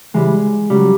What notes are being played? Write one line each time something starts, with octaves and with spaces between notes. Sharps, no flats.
C#3 E3 G3 G#3
C#3 F#3 G3